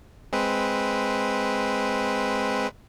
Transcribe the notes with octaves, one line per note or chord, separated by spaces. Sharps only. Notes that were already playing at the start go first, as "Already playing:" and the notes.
G#3 C4 B4